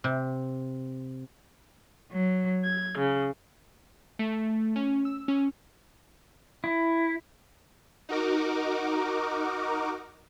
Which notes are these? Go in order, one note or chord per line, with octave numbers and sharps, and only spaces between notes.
C3
F#3
G#6
C#3
A3
C#4
E6
C#4
E4
D#4 F#4 A#4 D6